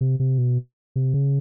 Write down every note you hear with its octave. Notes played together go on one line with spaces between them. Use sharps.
C3
C3
B2
C3
C#3